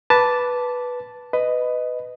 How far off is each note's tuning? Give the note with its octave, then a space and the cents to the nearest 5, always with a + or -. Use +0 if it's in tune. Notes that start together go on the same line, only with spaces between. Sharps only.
B4 -5 A5 +0 D6 -10
B4 +15 D#5 -5